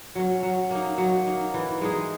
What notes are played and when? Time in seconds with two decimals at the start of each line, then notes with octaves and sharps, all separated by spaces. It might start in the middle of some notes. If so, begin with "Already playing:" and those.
0.15 F#3 C#4
0.43 F#3
0.71 A#3 D#4
0.98 F#3
1.27 A#3 D#4
1.54 E3
1.81 G#3 D#4 G#4